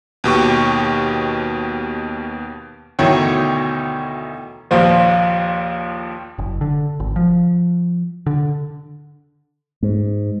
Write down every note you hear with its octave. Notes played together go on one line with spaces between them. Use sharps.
D#2 B2 G4 C#6
D2 B2 D#3 E3 C#5 G5
A#1 D#2 F3 F4 C5
F#1
D3
G#1
F3
D3
G#2